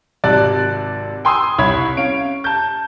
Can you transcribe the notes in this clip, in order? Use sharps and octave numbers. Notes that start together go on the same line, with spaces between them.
G#1 C3 D5 A5 F#6
G5 G#5 C6 D#6 E6
C2 E4 C#5 B5 G#6
C#4 F5 D7
A5 G6